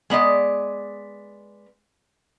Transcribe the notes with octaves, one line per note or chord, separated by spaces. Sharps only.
G#3 B3 D5 D#5